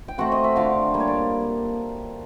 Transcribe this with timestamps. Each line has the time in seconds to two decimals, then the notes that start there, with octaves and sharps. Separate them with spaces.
0.08 G5
0.18 A3 C4 F#4 F#5
0.32 D#5
0.44 E5
0.56 D3 F4 F5
0.94 G3 A#3
1.00 C#5
1.08 D5